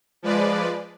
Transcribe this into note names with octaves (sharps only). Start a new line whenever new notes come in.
F3 G#3 B4 D5